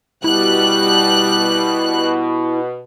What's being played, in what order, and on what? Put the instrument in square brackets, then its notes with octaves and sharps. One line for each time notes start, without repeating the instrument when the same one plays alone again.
[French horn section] B2 [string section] G3 F#6 [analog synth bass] E4